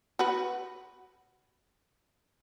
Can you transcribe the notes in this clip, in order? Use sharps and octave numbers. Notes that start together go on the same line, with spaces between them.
F#4 B4